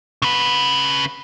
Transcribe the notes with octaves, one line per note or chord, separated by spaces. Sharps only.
C#3 B4